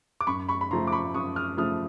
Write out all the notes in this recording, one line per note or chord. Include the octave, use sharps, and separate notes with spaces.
D6
F#2 B5 C#6
B5 C#6
B5
C#3 F3 A3 A#5 C6
D6
B5 C#6
F#2 C#6 D#6
D#6 F6
C#3 F3 A3 D#6 F6